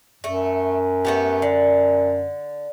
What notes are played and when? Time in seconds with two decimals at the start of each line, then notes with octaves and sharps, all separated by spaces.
0.24 F#2 A3
1.05 A3 B3 G4
1.42 D3